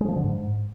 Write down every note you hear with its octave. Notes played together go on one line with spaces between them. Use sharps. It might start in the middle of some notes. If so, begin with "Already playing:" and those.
G#3
F3
D3
G#2